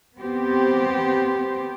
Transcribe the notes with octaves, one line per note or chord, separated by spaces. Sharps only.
B3 C4 G4 C5